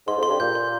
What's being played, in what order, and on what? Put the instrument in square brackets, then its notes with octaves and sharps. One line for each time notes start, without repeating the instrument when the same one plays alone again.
[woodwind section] G#2 [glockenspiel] C6
[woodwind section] F2
[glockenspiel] C6
[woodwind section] G2
[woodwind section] A#2 [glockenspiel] G6
[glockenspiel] C6